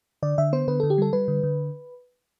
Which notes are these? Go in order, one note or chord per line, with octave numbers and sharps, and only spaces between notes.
D3 D5
D3 E5
B3 C5
D3 B4
D3 A4
G4
G3 A4
G3 B4
D3
D3